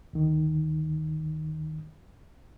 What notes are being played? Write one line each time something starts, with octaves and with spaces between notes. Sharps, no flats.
D2 D#3